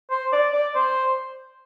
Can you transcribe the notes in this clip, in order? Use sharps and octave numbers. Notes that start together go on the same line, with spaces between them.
C5
D5
D5
C5